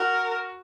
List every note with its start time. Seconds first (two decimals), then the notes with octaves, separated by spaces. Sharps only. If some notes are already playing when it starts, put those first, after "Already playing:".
Already playing: F#4 A#4